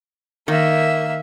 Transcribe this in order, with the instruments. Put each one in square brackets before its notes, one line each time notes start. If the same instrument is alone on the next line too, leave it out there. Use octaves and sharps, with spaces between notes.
[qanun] D#3 [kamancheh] A#3 E5